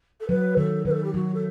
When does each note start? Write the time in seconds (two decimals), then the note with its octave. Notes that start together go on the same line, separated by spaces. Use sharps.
0.20 A4
0.29 F#3 B4
0.57 D#3 A4
0.85 D#3 B4
0.91 A4
1.03 G4
1.14 F#3 F#4
1.34 A4